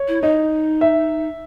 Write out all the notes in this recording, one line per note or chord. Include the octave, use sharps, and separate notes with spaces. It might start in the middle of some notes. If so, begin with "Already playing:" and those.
Already playing: C#5
E4
D#4 D#5
E5